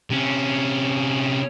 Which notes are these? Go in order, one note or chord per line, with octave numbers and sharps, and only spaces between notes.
C3 C#4